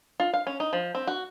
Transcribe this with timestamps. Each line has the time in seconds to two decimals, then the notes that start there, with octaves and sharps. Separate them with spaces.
0.20 F4
0.33 F5
0.47 C#4
0.60 D#4
0.73 F3
0.95 C4
1.07 F#4